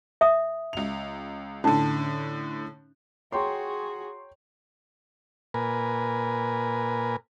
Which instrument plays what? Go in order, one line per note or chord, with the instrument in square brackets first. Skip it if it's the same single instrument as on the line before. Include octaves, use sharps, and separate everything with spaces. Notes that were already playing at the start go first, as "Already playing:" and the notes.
[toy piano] E5 D#6
[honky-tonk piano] C#2 F7
[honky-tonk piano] A2 D3 [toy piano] C#4 D#4
[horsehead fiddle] F#4 G#4 [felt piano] C#5 G5 A#5 [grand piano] C6 C#6
[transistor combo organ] A#2 A#4 B4 G#5